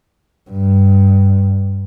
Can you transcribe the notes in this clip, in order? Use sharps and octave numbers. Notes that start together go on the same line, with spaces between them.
G2